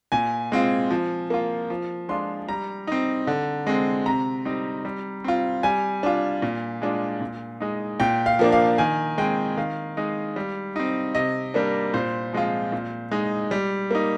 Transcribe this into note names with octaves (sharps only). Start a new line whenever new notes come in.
A#2 G#5
G#3 C4 F4
F3
A#3 F4
F3
G#3 D4 F4 C6
G3 A#5
C4 D#4
D3
G#3 C4
C3 A#5
G3 C4 D#4
G3
C4 F4
G3 G#5
D4 F4
A#2
G#3 D4 F4
A#2
G#3 D#4
A#2 G5
F5
F3 A#3 D4
F5
D#3 G#5
G#3 C4 G5
D#3 F5
G#3 D#4
G3
C4 D#4
C3 D#5
G3 A#3 D4
A#2 C5
F3 G#3 C4 F4
A#2
G#3 D#4
G3
A#3 D#4